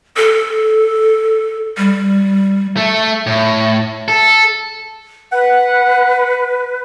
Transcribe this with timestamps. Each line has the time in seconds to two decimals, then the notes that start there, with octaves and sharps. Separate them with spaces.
0.17 A4
1.77 G3
2.77 A3
3.27 A2
4.08 A4
5.32 B4 F#5